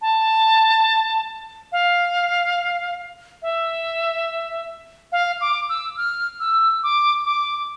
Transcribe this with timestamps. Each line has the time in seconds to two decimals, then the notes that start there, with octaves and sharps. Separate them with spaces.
0.02 A5
1.72 F5
3.42 E5
5.12 F5
5.41 D6
5.69 E6
5.97 F6
6.40 E6
6.83 D6
7.25 D6